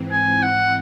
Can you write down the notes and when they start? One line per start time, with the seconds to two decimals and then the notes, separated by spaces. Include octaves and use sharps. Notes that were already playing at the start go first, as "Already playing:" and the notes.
Already playing: G#2 E3 C4
0.11 G#5
0.43 F#5